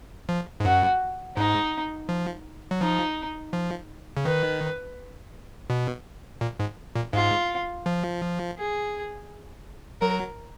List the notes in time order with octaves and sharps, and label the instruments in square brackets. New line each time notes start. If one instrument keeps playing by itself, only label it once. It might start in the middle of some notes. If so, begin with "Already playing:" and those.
[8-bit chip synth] F3
G#2
[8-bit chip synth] F#2 [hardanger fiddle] F#4
[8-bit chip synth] G#2 [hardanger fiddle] D#4
[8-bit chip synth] F3
F#3
[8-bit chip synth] F3 [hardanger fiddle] D#4
[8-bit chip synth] F3
C#3
[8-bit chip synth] D#3 [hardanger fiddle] B4
[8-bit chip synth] B2
A#2
G#2
A#2
[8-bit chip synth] G#2 [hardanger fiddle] F4
[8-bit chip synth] F3
[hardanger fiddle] G#4
[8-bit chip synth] F#3 [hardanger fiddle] A#4